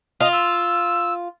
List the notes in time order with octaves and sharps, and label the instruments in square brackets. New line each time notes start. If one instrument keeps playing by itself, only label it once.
[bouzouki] F4 [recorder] D#5
[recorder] E6